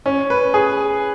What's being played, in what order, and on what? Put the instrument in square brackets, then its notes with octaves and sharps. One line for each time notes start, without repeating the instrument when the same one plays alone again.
[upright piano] C#4
B4
G#4